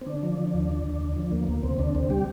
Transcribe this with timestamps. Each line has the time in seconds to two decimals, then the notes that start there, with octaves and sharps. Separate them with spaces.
0.01 C4
0.06 D3 D4
0.23 F3
0.38 F3
0.54 D#2
0.70 D3
0.85 D#2
1.01 D3
1.16 F3
1.32 D2 A#3
1.48 D2 A#3
1.63 D2 C3 C4
1.79 D2 D3 D4
1.95 D2 C3 C4
2.10 G3 G4